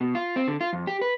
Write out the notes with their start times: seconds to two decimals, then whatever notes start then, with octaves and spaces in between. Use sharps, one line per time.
0.01 B2
0.15 F4
0.36 C4
0.48 D3
0.61 F4
0.73 F2
0.87 G4
1.01 B4